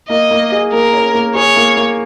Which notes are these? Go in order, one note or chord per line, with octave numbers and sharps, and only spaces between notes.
A#3 D#5
A#3
G#4
A#3 A#4
C#4
A#3
G#4 C#5
A#3
A#3